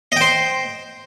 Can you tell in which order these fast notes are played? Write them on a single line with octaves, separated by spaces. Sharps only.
D#5 G5 C5